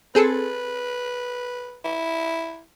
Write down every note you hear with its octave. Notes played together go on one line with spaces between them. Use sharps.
C4 G#4 A4 B4
E4